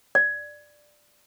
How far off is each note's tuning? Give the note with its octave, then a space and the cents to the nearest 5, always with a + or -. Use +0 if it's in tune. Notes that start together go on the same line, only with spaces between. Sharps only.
D5 +5